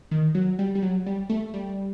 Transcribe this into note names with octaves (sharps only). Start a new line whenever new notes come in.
D#3
F#3
G3
G3
F#3
G3
A3
G3